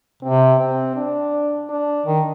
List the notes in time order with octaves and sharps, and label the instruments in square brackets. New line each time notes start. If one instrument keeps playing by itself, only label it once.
[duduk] C3 [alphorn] C4
[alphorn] C4
D4
D4
[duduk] D#3